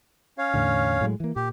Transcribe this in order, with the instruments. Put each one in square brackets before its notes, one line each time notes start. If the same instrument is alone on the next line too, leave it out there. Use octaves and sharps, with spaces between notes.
[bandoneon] C#4 C#5 F5
[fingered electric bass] E2 A2 D3
A2 F#3 G#3
E3 A#3
[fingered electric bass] A#2 [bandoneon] G4